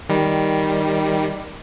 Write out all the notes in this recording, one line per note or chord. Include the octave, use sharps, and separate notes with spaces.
D#3 G3